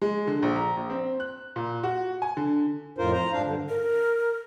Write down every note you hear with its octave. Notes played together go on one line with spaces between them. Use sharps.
G#3
D3
A#1
A#5
A#1
C4
F#6
A#2
F#4
G#5
D3
F2 A2 F4 A#4 C5
C5 A#5
G#2 D4 F5
G2 D3
A#4